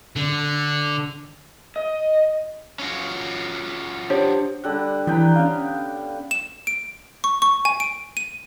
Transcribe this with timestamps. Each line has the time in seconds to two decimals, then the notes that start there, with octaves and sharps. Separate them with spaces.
0.16 D3
1.76 D#5
2.79 C#4 F4 F#4
4.10 D4 G4 C5 C#5
4.64 D3 G3 F#5
5.07 E3 B3 G5 A#5
5.36 C#4 F5
6.31 E7
6.67 D7
7.24 C#6
7.42 C#6
7.65 G#5
7.80 D7
8.17 D#7